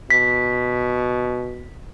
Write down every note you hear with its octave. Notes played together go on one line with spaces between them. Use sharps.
B2 B6